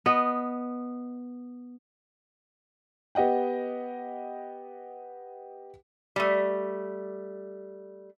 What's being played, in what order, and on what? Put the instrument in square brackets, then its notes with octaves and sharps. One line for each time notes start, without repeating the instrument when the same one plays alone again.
[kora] B3 D#5
[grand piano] B3 G4 D#5 F#5 G5
[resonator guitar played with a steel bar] G3 A3